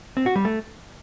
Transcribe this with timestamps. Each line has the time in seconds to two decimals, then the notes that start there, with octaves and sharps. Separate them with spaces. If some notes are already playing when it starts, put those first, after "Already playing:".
0.17 C4
0.26 F#4
0.36 G3
0.45 A3